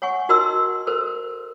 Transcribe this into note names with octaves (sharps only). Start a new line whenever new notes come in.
C#5 F#5 G#5 C#6
D#4 F#4 A#4 D#5 C6 E6
A4 A#4 C5